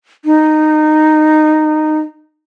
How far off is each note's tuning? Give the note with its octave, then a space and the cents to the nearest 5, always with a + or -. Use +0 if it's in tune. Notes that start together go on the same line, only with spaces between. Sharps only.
D#4 -15